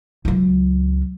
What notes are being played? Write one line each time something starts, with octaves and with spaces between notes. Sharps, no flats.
C#2 F#3